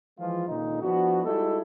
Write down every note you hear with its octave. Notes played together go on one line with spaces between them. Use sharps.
E3 F3 G#3 F4
C#2 A#2 D3 D#3 D#4
F3 B3 D4 E4 F#4
G3 G#3 D#4 E4 F#4 A4